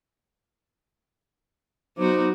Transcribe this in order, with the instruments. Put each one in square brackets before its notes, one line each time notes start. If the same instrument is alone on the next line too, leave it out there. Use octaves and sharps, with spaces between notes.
[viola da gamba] F#3 B3 F#4 [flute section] D#4 C5 D6